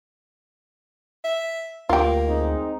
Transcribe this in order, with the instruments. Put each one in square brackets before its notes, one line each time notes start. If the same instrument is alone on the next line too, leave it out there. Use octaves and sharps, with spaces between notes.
[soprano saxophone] E5
[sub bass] D2 [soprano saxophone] A#3 [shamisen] F4 G4
[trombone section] G#3 C4 D#4